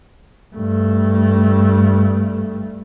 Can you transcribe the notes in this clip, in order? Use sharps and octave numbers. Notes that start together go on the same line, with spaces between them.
G2 A3